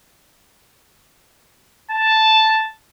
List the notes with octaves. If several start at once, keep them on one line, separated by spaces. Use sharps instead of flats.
A5